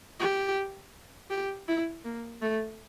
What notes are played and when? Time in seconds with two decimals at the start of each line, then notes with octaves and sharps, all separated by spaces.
0.19 G4
1.30 G4
1.68 E4
2.04 A#3
2.42 A3